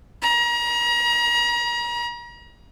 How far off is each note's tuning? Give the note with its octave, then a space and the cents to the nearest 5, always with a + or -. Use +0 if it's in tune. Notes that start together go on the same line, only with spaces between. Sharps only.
A#5 +35